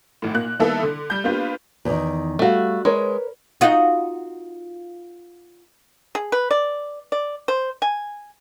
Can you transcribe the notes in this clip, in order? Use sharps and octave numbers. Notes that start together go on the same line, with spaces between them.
G#1 A2
A#2 A#3 F#6
D#3 G3 A#3 B3 E4 A4
D3
G3 G6
A#3 B3 D4 F4 G4 B4
E2 D#3
G3 A3 F#4 F5
G#3 A#4 B4 C#5
D#4 F4 F#4
G#4
B4
D5
D5
C5
G#5